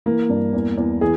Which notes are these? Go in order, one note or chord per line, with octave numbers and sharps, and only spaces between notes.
E3 A#3
G2
E2
E2
E3 G#4